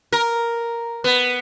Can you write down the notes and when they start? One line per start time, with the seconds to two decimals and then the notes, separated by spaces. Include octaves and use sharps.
0.12 A#4
1.04 B3